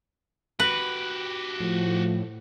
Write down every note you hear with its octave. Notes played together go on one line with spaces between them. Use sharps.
F#4 G4 B4
A2 F3